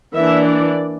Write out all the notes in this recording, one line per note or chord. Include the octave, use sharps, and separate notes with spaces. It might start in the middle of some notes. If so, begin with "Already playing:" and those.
E3 A#3 D4 E5
D5